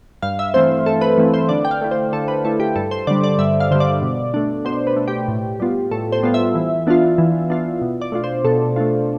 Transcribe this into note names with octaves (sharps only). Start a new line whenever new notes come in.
G2 F5
E5
E3 A3 C4 C5
G2 A4
B4
E3 A3 C4
C5
D3 D5
G5
F5
A3 E4
C5
D3 A4
B4
A3 E4 A4
G4
G2 A4
C5
D3 G3 D5
D5
G2 E5
F5
D3 G3 C5
D5
B2
A3 D4
B2 C5
B4
A3 D4
G4
A2
G3 B3 F4
A2 A4
C5
G3 B3 F4
E5
E3
B3 D4 F4
E3
B3 D4 F4
B2
D5
A3 D4 F4
C5
B2 A4
A3 D4 F4